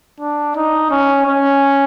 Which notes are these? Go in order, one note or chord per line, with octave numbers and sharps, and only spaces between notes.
D4
D#4
C#4
C#4